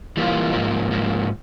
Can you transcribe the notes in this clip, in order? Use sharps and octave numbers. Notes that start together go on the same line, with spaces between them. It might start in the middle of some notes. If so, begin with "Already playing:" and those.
E3 G3 A#3 F4
G#2 F3 A#3
G#2 F3 A#3